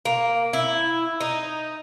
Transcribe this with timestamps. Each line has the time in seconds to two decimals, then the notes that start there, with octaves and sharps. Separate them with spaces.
0.05 A#3
0.53 E4
1.20 D#4